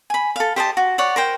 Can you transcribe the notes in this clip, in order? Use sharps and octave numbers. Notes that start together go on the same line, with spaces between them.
G#5 B5
A4 F5
G4 C5 D#5 A5
F#4
C#5 D5 F#5
A#4 C5 G5